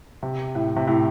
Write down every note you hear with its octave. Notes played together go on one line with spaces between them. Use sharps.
C3
A2
C3
A2